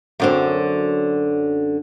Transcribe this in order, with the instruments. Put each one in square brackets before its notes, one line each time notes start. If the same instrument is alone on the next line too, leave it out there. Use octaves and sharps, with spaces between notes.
[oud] F#2 D3 C4